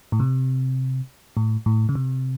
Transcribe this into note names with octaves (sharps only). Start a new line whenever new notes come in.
A2
C3
A2
A2
C#3
C3